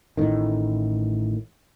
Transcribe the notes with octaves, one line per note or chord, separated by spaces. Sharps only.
A1 A2 D#3